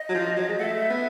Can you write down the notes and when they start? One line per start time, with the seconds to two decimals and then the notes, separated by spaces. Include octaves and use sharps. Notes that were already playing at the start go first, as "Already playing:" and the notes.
Already playing: D#5
0.09 F#3
0.14 F3
0.37 F#3
0.49 G#3
0.59 A3 E5 F#5
0.90 B3